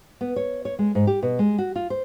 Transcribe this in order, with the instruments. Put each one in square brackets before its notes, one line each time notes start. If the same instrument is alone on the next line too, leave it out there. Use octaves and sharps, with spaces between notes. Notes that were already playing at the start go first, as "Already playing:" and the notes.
[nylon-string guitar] B3
C#5
C#5
G#3
G#2
G4
B2
G#3
F#4
F4
C5